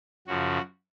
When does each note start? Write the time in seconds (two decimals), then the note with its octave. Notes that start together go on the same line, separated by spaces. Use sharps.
0.27 F#2 C#3 F3 F#4